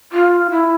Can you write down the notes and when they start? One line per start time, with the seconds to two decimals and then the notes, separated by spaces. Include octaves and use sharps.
0.12 F4
0.51 E4